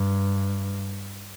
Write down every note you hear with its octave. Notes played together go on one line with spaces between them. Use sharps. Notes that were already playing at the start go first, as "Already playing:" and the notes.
Already playing: G2